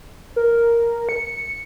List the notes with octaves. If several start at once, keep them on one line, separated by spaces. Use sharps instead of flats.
A#4
C#7